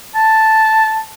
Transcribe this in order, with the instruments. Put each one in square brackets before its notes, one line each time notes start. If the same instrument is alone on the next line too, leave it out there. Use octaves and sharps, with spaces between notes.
[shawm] A5